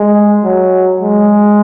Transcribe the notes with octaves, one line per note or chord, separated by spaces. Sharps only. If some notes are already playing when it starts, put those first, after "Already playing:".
Already playing: G#3
F#3
G#3